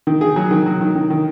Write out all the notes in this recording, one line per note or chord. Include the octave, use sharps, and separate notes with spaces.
D#3
G#4
F#3
D#3
F#3
D#3
D#3
D#3